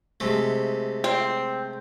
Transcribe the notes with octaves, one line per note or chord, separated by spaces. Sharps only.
C3 G#3 A3
C4